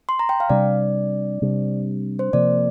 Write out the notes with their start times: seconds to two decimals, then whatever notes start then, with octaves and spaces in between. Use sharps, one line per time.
0.09 C6
0.19 A#5
0.29 G5
0.40 F5
0.50 C3 G3 D4 D5
1.42 C3 G3 D4
2.19 C5
2.33 C3 F3 A#3 D5